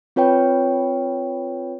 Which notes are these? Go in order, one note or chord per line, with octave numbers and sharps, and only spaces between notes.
C4 F4 B4 C#5 G5